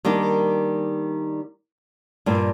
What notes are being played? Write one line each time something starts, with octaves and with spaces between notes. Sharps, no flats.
D#3 G3 A#3 D4
G2 A#2